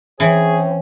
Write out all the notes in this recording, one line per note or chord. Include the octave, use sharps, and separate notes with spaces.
E3 C4 C#4 G#4 C#5